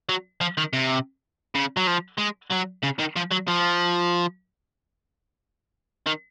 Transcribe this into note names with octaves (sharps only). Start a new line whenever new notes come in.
F#3
F3
D#3
C3
C#3
F#3
F3
G#3
F#3
C#3
D#3
F3
F#3
F3
D#3